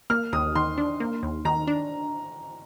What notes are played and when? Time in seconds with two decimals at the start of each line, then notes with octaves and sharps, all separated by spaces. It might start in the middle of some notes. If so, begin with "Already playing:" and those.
0.10 A#3 F6
0.32 D#2 D#6
0.55 D#3 C6
0.78 D4
1.00 A#3
1.23 D#2
1.45 D#3 A#5
1.67 D4